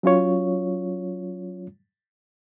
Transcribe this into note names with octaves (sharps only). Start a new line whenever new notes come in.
F#3 C#4 F4 C#5